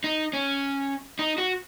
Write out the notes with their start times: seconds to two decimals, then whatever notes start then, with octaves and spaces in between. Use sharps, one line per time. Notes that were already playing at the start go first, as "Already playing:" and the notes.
0.04 D#4
0.33 C#4
1.19 D#4
1.38 F#4